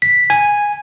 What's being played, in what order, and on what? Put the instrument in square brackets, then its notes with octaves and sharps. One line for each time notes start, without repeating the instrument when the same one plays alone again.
[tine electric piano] B6
G#5